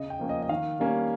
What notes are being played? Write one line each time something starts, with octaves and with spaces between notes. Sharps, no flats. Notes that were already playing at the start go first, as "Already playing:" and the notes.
Already playing: C#3 D#5
G5
F3 A#3 C#4
D#5
D#5
D#3 F5
G3 A#3 C#4